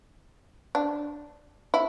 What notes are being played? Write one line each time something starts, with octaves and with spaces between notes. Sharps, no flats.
D4
E4